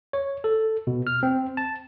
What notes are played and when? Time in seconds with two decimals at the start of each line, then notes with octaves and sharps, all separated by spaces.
0.13 C#5
0.44 A4
0.87 B2
1.07 F6
1.23 C4
1.57 A5